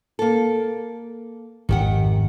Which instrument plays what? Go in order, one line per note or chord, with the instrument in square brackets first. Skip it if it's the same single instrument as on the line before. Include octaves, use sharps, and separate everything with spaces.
[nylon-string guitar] A#3 A4
[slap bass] G#1 F2 [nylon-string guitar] D#3 G4 F#5